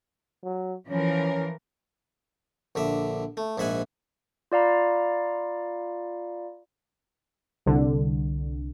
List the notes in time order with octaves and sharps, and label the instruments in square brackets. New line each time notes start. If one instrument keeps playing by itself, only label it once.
[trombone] F#3
[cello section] E3 F3 A#4 [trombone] C#4
[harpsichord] A#1 D3 E5
A3
A#1 G#2 E5 F#5 G#5
[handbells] F4 D5 F5 A#5 B5
[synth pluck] C2 D3